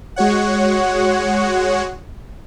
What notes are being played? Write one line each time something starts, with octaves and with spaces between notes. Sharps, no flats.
G#3 F#4 C#5 F#5